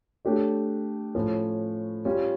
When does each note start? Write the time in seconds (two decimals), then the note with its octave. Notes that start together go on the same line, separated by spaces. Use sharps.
0.25 A3 D4 G4 C#5
1.15 A2 F3 C#4
2.05 G3 C#4 F4